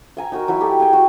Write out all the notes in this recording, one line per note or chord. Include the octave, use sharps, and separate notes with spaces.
E5 G#5 A#5
D#4 F#4 A#4
F#3 D#4 E4 B5
G4 A4
G#4 E5 G5 G#5
F#4